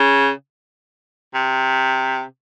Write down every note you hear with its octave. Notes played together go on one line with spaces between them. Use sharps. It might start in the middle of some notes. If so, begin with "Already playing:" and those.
Already playing: C#3
C3